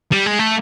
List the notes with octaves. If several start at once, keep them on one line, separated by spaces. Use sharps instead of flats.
G3
G#3
A3